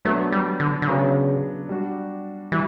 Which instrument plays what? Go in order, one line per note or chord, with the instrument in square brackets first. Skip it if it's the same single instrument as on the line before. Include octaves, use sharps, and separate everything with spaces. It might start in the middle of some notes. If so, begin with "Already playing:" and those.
[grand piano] F#3 B3 D4 [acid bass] A3
[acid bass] G3
D3
D3
[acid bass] C#3 [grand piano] F#3 B3 D4
[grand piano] G3 D4 F#4
[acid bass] E3 [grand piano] G3